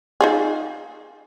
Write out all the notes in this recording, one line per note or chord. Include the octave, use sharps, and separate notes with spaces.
D#4 F4 G#4